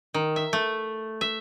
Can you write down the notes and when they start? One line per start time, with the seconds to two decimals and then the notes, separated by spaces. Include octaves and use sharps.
0.14 D#3
0.36 E5
0.53 A3
1.21 E5